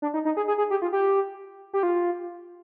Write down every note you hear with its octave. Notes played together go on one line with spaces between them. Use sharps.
D4
D#4
D#4
G#4
G#4
G#4
G4
F4
G4
G4
F4